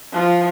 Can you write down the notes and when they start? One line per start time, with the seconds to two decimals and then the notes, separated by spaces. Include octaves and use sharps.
0.13 F3